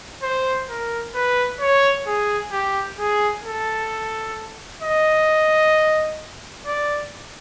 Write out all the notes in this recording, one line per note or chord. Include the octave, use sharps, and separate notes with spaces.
C5
A#4
B4
C#5
G#4
G4
G#4
A4
D#5
D5